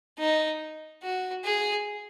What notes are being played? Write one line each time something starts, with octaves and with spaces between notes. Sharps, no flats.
D#4
F#4
G#4